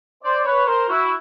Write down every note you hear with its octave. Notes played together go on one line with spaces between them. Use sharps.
C5 D5
B4 C#5
A#4 C5
E4 F#4